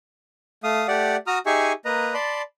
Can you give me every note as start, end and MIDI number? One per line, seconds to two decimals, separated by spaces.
0.64 0.87 57
0.64 0.87 77
0.64 0.87 87
0.88 1.16 57
0.88 1.16 67
0.88 1.16 74
0.88 1.16 78
1.27 1.39 66
1.27 1.39 82
1.27 1.39 87
1.27 1.39 89
1.46 1.73 63
1.46 1.73 67
1.46 1.73 68
1.46 1.73 76
1.46 1.73 80
1.46 1.73 85
1.85 2.14 58
1.85 2.14 71
1.85 2.14 75
1.85 2.14 82
2.14 2.42 74
2.14 2.42 81
2.14 2.42 83
2.14 2.42 84